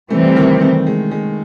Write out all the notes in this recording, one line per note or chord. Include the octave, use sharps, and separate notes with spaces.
C3 E3 G3 A3 C4
D#3
A3
G#3
G#3